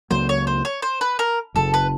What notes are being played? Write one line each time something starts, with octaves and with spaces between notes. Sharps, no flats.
C#2 C#3 F#3 A#3 C5
C#5
C5
C#5
C5
B4
A#4
F#1 F#2 C#3 A4
B4